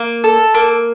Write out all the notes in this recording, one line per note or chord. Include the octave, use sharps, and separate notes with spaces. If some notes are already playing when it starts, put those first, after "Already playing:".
Already playing: A#3
A4
A#3